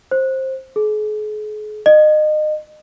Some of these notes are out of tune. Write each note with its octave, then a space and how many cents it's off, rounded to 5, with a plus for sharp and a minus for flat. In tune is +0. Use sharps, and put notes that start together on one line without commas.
C5 +15
G#4 +40
D#5 -30